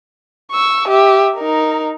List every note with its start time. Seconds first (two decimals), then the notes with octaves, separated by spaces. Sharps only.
0.51 C#6 E6
0.88 G4 E5
1.36 D#4 A#4